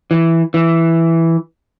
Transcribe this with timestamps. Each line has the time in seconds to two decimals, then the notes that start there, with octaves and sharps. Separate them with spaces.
0.11 E3
0.54 E3